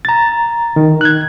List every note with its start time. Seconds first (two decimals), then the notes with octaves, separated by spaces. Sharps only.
0.05 A#5 A6
0.76 D#3
1.01 F#6 G#6